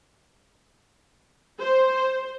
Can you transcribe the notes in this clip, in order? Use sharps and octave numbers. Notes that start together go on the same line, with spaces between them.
C5